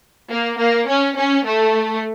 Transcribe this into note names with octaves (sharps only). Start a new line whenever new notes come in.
A#3
A#3
C#4
C#4
A3